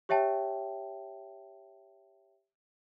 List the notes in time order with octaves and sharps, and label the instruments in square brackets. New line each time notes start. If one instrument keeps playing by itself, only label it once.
[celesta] G4 C#5 E5 G5 A5